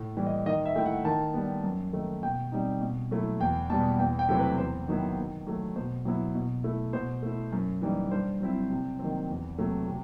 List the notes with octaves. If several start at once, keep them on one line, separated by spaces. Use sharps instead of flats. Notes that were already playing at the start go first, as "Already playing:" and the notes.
Already playing: A2
E3 G3
D#5
D#3 D#5
E5
A3 E4 G5
F#5
D#3 A5
G3 B3
F#2
D#3 A3 D#4
B2 G5
G3 C4 D#4
B2
F#3 A3 E4
E2 G5
B2 G3 B3 A5
E2 G5
G5
C3 F#3 A3 E4 C5
B4
E2 C5
D#3 F#3 B3 E4
D#3
F#3 A3
B2 C5
F#3 B3 E4
B2
A3 E4
B2 C5
A3 E4
F#2
E3 G3 D#4
G2 C5
F#3 C4 E4
C3
D#3 F#3 C4
E2
C3 F#3 A3
C3